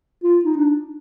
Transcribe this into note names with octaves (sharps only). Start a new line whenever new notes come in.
F4
D#4
D4